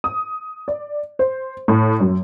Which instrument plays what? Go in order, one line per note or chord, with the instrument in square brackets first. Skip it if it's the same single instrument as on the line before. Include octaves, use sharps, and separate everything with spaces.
[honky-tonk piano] D#6
D5
C5
A2
F#2